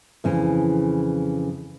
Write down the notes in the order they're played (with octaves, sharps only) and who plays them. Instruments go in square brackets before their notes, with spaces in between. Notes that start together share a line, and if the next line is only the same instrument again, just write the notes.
[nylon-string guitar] F2 C#3 E3